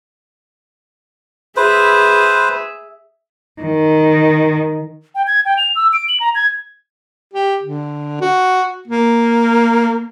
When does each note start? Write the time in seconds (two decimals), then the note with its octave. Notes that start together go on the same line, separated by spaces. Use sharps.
1.56 G#4 B4 C5 E5
3.62 D#3
5.15 G5
5.27 G#6
5.45 G5
5.58 F7
5.75 E6
5.93 D7
6.08 F#7
6.20 A#5
6.35 G#6
7.33 G4
7.63 D3
8.21 F#4
8.88 A#3